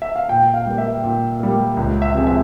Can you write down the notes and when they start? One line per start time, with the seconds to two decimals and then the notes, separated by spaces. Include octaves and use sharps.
0.02 E5
0.16 F5
0.28 A#2 G5
0.54 F5
0.66 G3 A#3
0.78 E5
1.03 A#2
1.40 G3 A#3
1.77 C#2
2.02 E5
2.14 C3 F3 G#3 C4
2.27 E5